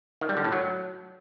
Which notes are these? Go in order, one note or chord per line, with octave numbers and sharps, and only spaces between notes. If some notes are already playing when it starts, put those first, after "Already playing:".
D#3
G3
D3
A2
F#3